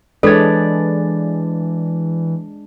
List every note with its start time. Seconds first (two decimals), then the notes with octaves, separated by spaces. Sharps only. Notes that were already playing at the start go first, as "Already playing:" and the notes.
0.23 E3 G#3 D4 A4 B4 C#5 D5